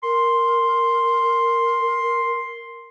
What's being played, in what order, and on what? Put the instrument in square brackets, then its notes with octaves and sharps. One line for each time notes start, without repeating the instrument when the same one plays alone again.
[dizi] A#4 [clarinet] C6